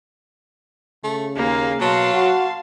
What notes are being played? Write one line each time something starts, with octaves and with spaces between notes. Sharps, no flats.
C#3 A3
D#2 A#3 G#4 F5
B2 F#3 F5 A5 C6
F#4